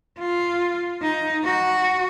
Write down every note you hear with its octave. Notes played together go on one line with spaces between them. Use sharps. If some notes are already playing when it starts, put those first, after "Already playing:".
F4
D#4
F#4